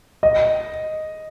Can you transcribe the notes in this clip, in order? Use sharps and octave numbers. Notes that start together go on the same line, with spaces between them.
D#5